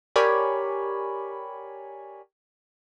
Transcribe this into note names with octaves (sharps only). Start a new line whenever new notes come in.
G4 A#4 C#5 D5 G#5 B5